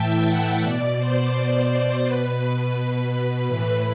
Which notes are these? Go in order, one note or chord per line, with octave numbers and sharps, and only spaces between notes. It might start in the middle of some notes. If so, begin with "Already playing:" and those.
Already playing: A2 E3 E5 G5 A5
F#5
B2 D5
C5
C5
B2 B4
B4
B4
A2 E3 B4